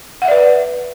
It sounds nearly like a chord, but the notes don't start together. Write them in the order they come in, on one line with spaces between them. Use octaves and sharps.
F#5 E5 D5 B4